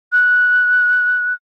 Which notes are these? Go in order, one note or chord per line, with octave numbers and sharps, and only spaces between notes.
F#6